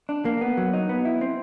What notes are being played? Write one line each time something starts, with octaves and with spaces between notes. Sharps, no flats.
D4
A#3
B3
F#3
D#4
B3
E4
C4